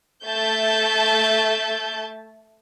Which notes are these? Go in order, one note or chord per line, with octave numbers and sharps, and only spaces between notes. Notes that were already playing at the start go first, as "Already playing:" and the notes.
A3 E5 A5 G6